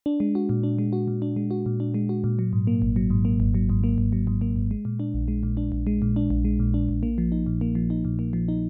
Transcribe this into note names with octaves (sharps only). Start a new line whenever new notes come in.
D4
G#3
F#4
A#2
D4
G#3
F#4
A#2
D4
G#3
F#4
A#2
D4
G#3
F#4
A#2
F#3
G#2
A#3
G#1
F#3
G#2
A#3
G#1
F#3
G#2
A#3
G#1
F#3
G#2
A#3
G#1
G#3
A#2
D4
A#1
G#3
A#2
D4
A#1
G#3
A#2
D4
A#1
G#3
A#2
D4
A#1
A#3
F3
D#4
A#2
A#3
F3
D#4
A#2
A#3
F3
D#4